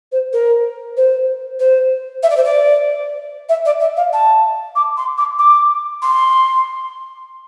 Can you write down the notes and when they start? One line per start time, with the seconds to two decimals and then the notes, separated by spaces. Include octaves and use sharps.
0.11 C5
0.32 A#4
0.96 C5
1.59 C5
2.22 E5
2.29 D5
2.36 C5
2.44 D5
3.48 E5
3.65 D5
3.80 E5
3.96 F5
4.12 A5
4.75 D6
4.97 C6
5.17 D6
5.38 D6
6.02 C6